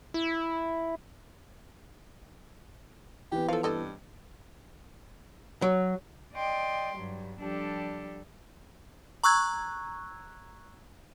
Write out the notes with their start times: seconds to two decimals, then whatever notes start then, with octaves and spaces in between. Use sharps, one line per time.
0.14 E4
3.32 E3 B3 G4
3.48 F3 A4 F5
3.63 G2 C4 A4 D#5
5.62 F#3
6.33 D5 D#5 G5 C6 D6
6.95 G2 F#3 G3
7.40 F3 G3 D4 G4 A4
9.24 A#5 C#6 E6 F#6 G#6